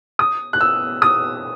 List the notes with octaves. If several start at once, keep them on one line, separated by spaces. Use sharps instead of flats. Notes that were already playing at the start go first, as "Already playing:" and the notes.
D#6
F#6
E6
D#6